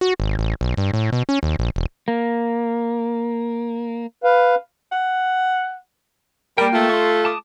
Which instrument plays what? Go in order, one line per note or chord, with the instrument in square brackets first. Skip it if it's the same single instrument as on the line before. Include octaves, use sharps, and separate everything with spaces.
[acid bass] F#4
G#1
A1
B1
G2
A2
B2
C#4
D#2
A#1
E1
[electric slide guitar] A#3
[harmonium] B4 F5
[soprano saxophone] F#5
[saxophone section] G3 A#4 [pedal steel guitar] A#3 G5
[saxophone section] A3 F4
[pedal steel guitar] C6 C#6
A5 D6 D#6